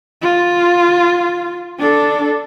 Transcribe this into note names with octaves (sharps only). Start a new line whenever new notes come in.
F4
D4 A4